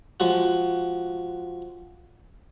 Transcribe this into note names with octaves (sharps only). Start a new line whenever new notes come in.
F3 G#3 F#4